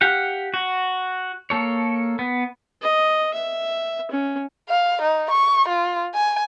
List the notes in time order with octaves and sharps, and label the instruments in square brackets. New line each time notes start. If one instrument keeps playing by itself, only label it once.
[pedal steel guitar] G4 F5 F#5
F#4
A#3 A4 C#5
B3
[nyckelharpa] D#5
E5
C#4
[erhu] F5
D#4
C#6
F4
G#5